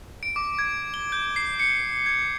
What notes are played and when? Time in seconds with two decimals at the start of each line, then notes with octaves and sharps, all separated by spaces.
0.23 D7
0.36 D6
0.59 G#6
0.94 G7
1.12 G6
1.36 C7
1.60 C#7
2.06 G#6